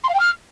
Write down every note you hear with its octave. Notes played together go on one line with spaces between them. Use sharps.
C6
F5
G5
F6